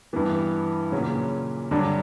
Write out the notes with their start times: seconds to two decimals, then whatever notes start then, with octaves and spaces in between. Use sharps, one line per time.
0.13 G2 E3 B3
0.92 A#2 C#3 F#3 C#4
1.71 G2 D3 F#3 D4